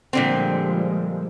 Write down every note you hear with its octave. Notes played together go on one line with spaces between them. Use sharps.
A#2 D3 F3 G3 G#3 C4